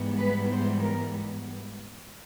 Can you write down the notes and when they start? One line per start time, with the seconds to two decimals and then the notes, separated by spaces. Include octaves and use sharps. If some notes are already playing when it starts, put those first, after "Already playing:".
Already playing: G#2 E3 G3 B3
0.19 B4
0.51 C5
0.82 A#4